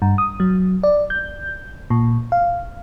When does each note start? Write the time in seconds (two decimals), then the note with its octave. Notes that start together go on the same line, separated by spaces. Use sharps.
0.02 G2
0.18 D#6
0.40 F#3
0.83 D5
1.10 G6
1.90 A#2
2.32 F5